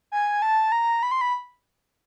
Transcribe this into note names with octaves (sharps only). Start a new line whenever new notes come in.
G#5
A5
A#5
B5
C6
B5